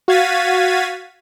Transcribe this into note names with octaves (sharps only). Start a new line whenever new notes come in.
F#4 F5 G#6 A6 B6 D#7